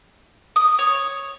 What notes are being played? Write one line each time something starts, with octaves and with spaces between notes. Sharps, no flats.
D#6
C#5